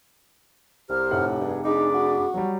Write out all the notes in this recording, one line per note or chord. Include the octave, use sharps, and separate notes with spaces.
C2 G4 C5 A#5 F6
F1 A2 F#5
G2 G#4
D4 D#4 G#4 B5 D6
F#4
F#3 G3